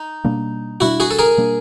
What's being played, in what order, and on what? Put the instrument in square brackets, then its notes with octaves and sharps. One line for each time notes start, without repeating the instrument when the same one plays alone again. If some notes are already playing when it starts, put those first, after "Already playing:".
Already playing: [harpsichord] D#4
[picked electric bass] B2 G3 A#3 D4
[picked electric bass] B2 G3 A#3 D4 [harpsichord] E4 F#4
[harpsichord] F#4 G#4
A4
G#4 A#4
[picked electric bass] B2 G3 A#3 D4